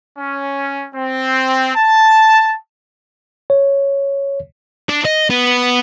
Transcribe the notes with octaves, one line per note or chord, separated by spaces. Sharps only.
C#4
C4
A5
C#5
D4
D#5
B3